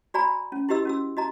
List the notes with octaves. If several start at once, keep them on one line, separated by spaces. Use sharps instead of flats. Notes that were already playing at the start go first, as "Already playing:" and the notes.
F#4 D5 G#5 A#5 B5
C#4
E4 F#4 G4 B4 D#5 E6
C#4 F#4 E6
F#4 D#5 A#5